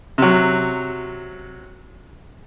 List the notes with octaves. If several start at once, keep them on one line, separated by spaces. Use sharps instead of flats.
C3 F#3